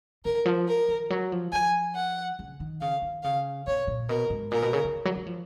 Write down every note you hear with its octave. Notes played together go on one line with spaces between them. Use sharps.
C#3 A#4
F3
A#4
D#3
F#3
F3
F3 G#5
F#5
C#3
D#3
C#3 F5
D#3
C#3 F5
B2 C#5
A#2
B2 A#4
G#2
A#2 A#4
B2
C#3
C#3
C#3
F#3
F#3
F3